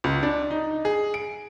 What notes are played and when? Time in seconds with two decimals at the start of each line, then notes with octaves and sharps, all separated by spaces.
0.04 C#2
0.23 D4
0.51 D#4
0.85 G#4
1.14 D7